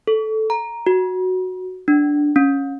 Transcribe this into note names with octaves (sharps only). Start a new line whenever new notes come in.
A4
A#5
F#4
D4
C#4